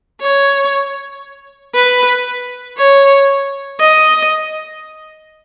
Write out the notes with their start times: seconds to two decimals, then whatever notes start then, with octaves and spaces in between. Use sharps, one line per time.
0.21 C#5
1.74 B4
2.78 C#5
3.80 D#5